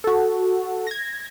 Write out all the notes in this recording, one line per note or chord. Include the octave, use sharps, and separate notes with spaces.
F#4 A4
G#6 A#6